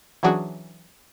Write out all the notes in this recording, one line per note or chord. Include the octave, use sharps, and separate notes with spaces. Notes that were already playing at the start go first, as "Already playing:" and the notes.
E3 F#3 C#4 D4 F#4 G#4